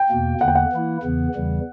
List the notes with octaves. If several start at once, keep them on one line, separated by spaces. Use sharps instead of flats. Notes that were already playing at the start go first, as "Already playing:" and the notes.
Already playing: G5
E2 B2 A#3
E2 D3 A#3 F#5
G5
F#5
E3 A#3 E4
E2 C#3 E3 B3
E2 C#3 E3 G3